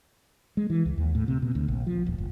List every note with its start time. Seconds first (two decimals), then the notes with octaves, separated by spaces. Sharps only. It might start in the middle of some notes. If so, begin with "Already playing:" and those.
0.57 G#3
0.70 E3
0.86 C#2
0.98 D#2
1.15 A2
1.28 C3
1.42 B2
1.55 D2
1.68 A#1
1.87 F3
2.06 D#1
2.18 F#1